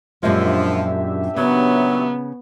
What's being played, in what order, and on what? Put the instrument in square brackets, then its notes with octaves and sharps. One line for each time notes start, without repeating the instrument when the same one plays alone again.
[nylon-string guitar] F#2 A#2 G#3 [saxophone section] F3 [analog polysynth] D4 G4 E5
[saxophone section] A#2 F#3 [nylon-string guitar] C#3 [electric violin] B3